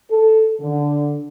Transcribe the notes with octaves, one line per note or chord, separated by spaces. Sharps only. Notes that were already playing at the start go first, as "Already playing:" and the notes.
A4
D3